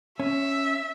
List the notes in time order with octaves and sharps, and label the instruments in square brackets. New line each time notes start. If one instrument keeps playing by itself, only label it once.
[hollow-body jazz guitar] C#4 [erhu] E5